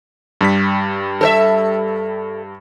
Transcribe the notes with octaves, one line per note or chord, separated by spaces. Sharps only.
G2 G3 B6
A4 C5 E5